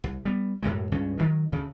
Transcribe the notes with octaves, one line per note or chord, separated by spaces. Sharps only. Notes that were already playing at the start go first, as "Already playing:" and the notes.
C2
G3 B3
F#2 A2 C3 G#3
C#2 G2 C#3 C#4
D2 D#3 F#3
D2 C#3